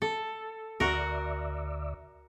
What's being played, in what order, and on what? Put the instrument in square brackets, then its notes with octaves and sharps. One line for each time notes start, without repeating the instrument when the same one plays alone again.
[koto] A4
[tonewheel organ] D2 D5 E5 [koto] F#4 A#4